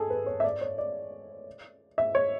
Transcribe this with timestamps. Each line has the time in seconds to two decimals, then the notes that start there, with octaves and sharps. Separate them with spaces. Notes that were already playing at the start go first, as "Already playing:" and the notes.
Already playing: G#4 A4
0.10 B4
0.26 C#5
0.40 E5
0.44 D5
0.61 C#5
0.78 D5
1.98 E5
2.15 C#5